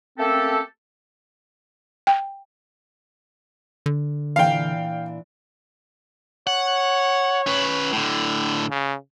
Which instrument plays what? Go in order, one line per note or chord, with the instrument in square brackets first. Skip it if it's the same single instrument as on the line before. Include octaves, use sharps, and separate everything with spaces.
[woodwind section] A3 A#3 C4 C#4 G4 A4
[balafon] G5
[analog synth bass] D3
[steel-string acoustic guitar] A#2 E3 D4 [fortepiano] F5 G5
[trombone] C#5 [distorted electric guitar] F#5
[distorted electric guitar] C#4 B4
A2 D3
[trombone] C#3